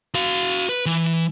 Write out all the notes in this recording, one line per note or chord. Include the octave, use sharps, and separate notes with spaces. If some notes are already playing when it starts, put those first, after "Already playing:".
F#4 F5
B4
E3